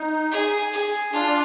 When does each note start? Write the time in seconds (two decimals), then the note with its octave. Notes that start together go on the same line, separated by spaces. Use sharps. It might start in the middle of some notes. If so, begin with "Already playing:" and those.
Already playing: D#4
0.31 G#4
0.73 G#4
1.13 D4 F4